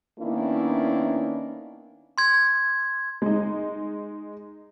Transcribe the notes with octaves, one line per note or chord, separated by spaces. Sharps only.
D#3 A#3 B3 C#4 D4 E4
C6 G#6
G#3 D#4